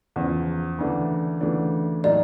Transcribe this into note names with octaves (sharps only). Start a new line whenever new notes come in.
E2 C#3 F3
D2 C#3 E3 A3 D4
D2 C#3 E3 A3 D4
A2 F#3 A#3 D#4 D5